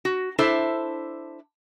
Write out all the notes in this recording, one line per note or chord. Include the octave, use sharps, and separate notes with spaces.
F#4
D4 E4 A4 C5 E5